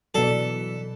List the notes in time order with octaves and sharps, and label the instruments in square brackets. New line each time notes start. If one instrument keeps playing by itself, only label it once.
[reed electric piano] B2 F#3 [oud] E3 D4 [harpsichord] A4